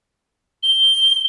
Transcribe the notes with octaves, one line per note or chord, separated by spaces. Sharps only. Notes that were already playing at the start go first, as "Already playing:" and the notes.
G7